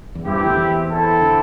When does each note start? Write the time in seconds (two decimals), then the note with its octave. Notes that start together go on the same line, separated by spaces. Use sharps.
0.15 E2
0.25 G2 C4 E4 G4
0.35 E2 E3
0.47 D2 D3
0.57 E2 E3
0.89 C4 E4 A4
1.21 D3